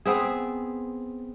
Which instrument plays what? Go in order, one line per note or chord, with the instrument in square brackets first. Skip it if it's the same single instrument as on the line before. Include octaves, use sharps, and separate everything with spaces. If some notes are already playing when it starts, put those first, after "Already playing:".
[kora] B3 C4 G#4